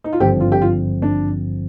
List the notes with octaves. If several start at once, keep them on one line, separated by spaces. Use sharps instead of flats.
D#4
F4
G#1 G2 D3 F3 C4 G4
F4
G4
F4
D4